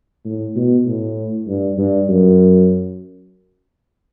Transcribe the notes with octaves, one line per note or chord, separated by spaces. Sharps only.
A2
B2
A2
G2
G2
F#2